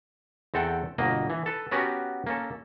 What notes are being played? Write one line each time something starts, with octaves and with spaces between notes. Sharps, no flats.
E2 C4 A4 F#5 G5
G1 B2 A#3 D#5
E3
A4 B4
B3 C#4 F#4 G4 A#4
A#3 C#4 A4